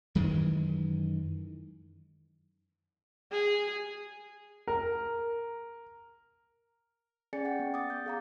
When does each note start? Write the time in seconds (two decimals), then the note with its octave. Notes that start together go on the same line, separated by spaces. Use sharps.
0.15 F#2 D#3 E3 G#3
3.32 G#4
4.68 A#4
7.33 C#4 G#4 D5 G#5 A6 C#7
7.45 F#5 G5
7.59 B3
7.74 D6 D#6 A6
7.90 G6
8.06 G#4 F5 A#5